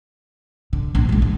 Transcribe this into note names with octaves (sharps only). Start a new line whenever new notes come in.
D3
A#1
F2 G#2
D4